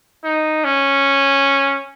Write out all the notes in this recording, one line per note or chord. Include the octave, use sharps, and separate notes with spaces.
D#4
C#4